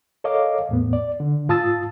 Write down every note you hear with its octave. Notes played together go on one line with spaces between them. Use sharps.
A4 A#4 C#5 D#5 F5 D6
E2 A2 B3
D5
D3
G#2 F4 A5 D#6 E6 A6